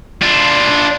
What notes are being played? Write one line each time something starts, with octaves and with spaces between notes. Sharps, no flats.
D4 F4